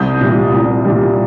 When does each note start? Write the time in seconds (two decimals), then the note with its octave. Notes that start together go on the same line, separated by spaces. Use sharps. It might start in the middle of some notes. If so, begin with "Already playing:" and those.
Already playing: C2 D#6 G6
0.21 A#2 G3
0.52 C2
0.85 A#2 G3